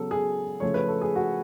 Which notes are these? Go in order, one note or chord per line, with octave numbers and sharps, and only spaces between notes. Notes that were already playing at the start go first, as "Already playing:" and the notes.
Already playing: C#3 F#3 B3 A4
G#4
C#3 F3 A3 C#4 C#5
B4
A4
G#4
F#4